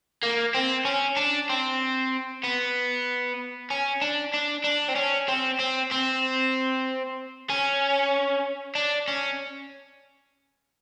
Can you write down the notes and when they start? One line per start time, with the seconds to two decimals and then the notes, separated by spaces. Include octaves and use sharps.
0.23 A#3
0.55 C4
0.85 C#4
1.17 D4
1.49 C4
2.44 B3
3.71 C#4
4.02 D4
4.34 D4
4.64 D4
4.89 C4
4.96 C#4
5.28 C4
5.59 C4
5.91 C4
7.50 C#4
8.75 D4
9.08 C#4